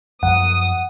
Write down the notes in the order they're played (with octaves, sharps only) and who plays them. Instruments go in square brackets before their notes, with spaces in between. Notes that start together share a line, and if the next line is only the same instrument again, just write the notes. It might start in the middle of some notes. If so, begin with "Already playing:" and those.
[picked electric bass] F#2 F3 [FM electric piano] F#5 [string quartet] D#6